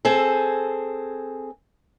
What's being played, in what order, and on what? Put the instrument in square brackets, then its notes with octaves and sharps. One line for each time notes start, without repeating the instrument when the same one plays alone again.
[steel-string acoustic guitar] C4 G#4 A4